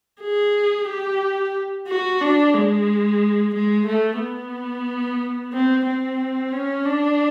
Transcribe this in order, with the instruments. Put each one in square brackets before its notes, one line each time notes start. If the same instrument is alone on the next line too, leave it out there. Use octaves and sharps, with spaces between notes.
[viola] G#4
G4
F#4
D4
G#3
G#3
A3
B3
C4
C4
C#4
D4